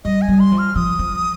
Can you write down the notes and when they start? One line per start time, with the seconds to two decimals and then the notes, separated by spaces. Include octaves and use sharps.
0.04 G3 D#5
0.22 G#5
0.28 G3
0.40 C6
0.52 F3
0.58 F6
0.76 F3 D#6
0.99 F3